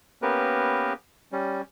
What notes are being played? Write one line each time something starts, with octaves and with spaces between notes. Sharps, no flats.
A#3 B3 C#4 G4 A#4 B4
G3 C#4